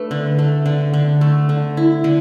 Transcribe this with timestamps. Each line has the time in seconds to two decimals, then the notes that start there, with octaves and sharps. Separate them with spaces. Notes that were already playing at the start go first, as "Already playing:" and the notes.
Already playing: A3 D4 B4
0.11 D3
0.39 A3
0.66 D3
0.94 D3
1.21 A3
1.49 D3
1.77 E4
2.04 D3